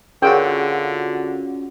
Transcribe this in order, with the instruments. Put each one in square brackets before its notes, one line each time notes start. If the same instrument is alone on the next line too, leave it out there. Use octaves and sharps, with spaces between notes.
[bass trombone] D3 [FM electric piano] C#4 F4 F#4 [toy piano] G#4 A#4 C#6 [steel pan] G5